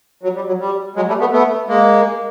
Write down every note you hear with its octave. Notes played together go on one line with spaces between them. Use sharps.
F#3
G3
F#3
G3
F#3 G#3
G3 A3
A3 B3
A3 B3
G#3 A#3